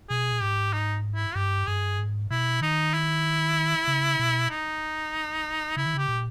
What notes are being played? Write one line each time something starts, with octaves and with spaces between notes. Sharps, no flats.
B2 G#4
A#2
G#2 G4
D#4
E4
G2 G4
G2 G#4
G#2
B2 E4
D#3 D#4
E4
C#3
B2
D#4
C#3 E4
D#3
C#3 G4
A#2